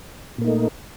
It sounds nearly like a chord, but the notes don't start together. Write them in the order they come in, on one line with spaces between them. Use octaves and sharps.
A#2 A#3 D#4 A3